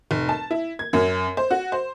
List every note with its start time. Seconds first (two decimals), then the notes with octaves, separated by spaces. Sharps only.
0.11 F1
0.29 A5
0.51 E4
0.79 G#6
0.93 F#2
1.37 C5
1.51 F#4
1.72 C5